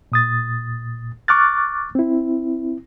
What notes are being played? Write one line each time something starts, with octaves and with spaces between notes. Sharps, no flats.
A#2 D#6 A6
C#6 D6 F6 F#6 A6
C4 E4